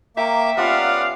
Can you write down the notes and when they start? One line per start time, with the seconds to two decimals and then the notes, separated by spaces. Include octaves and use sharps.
0.17 A#3 E5 G5 A#5 C#6 D6
0.57 G3 B3 C#4 F4 D5 F5 F#5 D#6